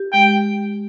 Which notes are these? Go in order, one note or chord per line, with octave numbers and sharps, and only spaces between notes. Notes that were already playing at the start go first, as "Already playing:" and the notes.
Already playing: G4
G#3 G5